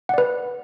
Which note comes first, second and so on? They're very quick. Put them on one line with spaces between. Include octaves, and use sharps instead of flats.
F#5 D5 B4